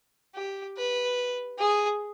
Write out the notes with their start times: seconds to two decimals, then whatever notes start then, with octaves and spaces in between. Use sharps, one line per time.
0.35 G4
0.77 B4
1.58 G#4